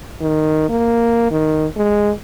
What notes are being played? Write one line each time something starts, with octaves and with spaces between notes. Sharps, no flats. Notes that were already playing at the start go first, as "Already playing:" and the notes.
D#3
A#3
D#3
G#3